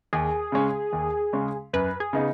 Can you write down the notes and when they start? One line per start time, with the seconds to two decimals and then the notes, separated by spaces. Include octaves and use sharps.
0.13 D#2 G#4
0.52 C#3 G#3 C#4
0.93 D#2
1.33 C#3 G#3 C#4
1.73 F#2 B4
2.00 G#4
2.13 C#3 B3 D#4